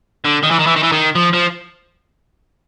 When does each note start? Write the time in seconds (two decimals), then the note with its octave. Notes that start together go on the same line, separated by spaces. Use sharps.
0.25 D3
0.43 D#3
0.51 E3
0.59 D#3
0.67 E3
0.76 D#3
0.83 E3
0.92 D#3
1.15 F3
1.33 F3